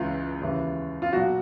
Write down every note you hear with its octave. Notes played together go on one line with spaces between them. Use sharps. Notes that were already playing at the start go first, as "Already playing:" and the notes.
Already playing: C#2 C#3 E3 F4
D#2 C#3 E3
F4
B1 A#2 F#4